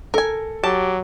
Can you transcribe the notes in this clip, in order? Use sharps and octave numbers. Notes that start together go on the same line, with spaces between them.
A4 A#4 G#5
F#3 G4 A5